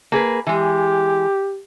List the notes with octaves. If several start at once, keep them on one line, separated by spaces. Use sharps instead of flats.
A#3 G#4 B4
E3 G#3 G4